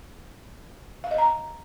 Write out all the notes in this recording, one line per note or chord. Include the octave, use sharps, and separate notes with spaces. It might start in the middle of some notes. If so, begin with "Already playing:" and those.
F5
D#5
A#5